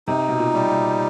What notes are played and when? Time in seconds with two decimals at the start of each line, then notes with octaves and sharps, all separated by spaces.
0.08 C3 D#4
0.29 B2
0.38 A#2
0.54 G3
0.69 B2